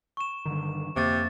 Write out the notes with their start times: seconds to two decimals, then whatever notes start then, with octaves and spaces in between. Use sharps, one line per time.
0.17 C#6 E7
0.45 G2 D3 D#3
0.96 F2 C3 A#3 C#6 A6